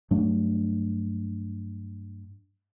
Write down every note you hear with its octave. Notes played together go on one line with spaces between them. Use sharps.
G2 F#3 A3 D4